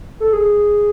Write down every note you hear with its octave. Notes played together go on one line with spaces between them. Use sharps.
A4
G#4